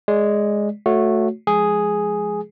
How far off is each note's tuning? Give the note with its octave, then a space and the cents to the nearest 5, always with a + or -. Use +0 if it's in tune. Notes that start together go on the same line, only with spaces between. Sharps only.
G#3 +0 D5 -10
A3 +0 F#4 -15 C#5 +0
F3 +0 G#3 +10 G#4 +0